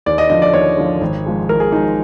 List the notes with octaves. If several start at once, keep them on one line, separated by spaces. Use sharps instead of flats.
D#2 D5
D#5
D3 F3 D#5
D5
D#2 C#5
D3 F3
G#1
G#2 F3 G#3
G#1 A#4
G#4
G#2 F3 G#3 D#4